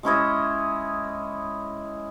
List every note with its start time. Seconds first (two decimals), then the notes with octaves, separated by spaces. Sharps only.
0.03 G#3 C#4 E4 D#5